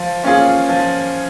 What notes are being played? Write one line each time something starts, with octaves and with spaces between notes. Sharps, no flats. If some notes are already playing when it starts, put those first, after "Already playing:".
Already playing: F3
A#3 C#4 F4 G#4
F3